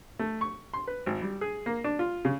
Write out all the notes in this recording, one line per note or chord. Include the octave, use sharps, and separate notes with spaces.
A3
C#6
C6
B4
G#1
G3
G#4
A#3
D4
F4
C#3